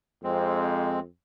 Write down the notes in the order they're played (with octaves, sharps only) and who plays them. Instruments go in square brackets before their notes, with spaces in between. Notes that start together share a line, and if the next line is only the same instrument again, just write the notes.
[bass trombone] F2 [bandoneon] G#3 C4